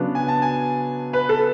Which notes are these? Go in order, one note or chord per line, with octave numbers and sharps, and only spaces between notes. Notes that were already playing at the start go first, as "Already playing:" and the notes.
Already playing: C#3 F#3 B3 D4
G#5
A5
G#5
B4
A4